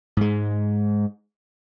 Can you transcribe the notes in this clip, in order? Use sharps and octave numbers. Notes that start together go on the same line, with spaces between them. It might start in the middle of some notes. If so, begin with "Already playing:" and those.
G#2 G#3